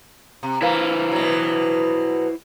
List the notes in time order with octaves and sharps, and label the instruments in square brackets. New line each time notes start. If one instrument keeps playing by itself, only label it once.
[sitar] C3
[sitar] A#3 [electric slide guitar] E4 B4 C5
[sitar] B2 F#3